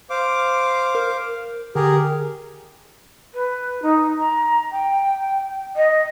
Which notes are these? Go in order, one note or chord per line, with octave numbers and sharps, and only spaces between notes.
C5 F5 D6
A#4
D3 G4 G#4 A#4
B4
D#4
A#5
G5
D#5